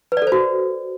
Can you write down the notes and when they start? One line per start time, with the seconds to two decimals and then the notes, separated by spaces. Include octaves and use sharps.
0.12 B4
0.17 D5
0.22 A4
0.27 C5
0.32 F#4